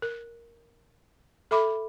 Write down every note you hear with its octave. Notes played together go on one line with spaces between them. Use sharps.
A#4
A4 E5 B5 D6